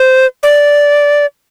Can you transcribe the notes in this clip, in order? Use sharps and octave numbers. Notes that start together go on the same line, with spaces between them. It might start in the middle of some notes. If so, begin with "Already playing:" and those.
Already playing: C5
D5